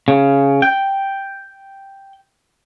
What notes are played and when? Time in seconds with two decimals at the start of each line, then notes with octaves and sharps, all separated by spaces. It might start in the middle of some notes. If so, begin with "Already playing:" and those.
0.08 C#3
0.62 G5